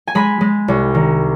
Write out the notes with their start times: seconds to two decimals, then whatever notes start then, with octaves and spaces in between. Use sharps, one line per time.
0.07 G#5
0.15 G#3 B5
0.41 G#3
0.68 C2
0.95 D#3